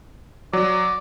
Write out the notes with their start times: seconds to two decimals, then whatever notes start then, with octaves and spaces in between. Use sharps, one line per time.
0.53 F#3 D5